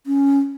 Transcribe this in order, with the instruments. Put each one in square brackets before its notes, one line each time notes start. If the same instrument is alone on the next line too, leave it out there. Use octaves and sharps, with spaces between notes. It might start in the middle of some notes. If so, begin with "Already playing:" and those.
[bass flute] C#4